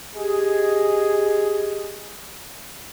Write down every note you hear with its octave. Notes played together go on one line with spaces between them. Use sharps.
G4 G#4 D#5